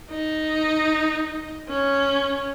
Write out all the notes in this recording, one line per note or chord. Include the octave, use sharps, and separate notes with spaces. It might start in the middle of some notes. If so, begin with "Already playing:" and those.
D#4
C#4